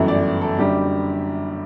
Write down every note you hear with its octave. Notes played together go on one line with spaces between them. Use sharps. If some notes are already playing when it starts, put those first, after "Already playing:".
Already playing: G1 F#2 E3 A3
D5
A4
F#1 F#2 D3 G3 G4